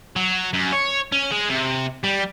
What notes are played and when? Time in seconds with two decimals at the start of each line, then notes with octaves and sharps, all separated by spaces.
0.16 F#3
0.54 F#2
0.73 C#5
1.12 C#4
1.32 G#3
1.50 C3
2.04 G3